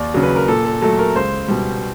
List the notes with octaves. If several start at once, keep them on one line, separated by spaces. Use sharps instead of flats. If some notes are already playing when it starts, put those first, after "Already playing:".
Already playing: D#2 D5
C#3 F#3
B4
A#4
A#2 A4
A4
F#3 A3 A4
A#4
C#2 C5
B2 G3